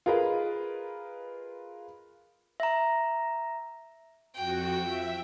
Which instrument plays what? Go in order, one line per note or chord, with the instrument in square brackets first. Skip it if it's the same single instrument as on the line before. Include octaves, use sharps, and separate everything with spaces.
[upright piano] F4 G#4 A#4 B4 D#5
[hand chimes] E5 A#5
[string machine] F2 F#4 [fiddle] G5
[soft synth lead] F3 [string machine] E5